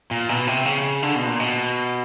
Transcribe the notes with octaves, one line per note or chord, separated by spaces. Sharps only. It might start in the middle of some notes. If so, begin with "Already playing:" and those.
A#2
B2
C3
C#3
D3
B2
A#2
B2